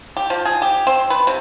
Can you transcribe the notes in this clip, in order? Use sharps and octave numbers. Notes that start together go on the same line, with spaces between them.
G4
F3
G#4
G4
C4
B4
C3